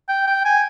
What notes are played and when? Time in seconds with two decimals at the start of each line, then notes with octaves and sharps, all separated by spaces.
0.09 G5
0.27 G5
0.45 G#5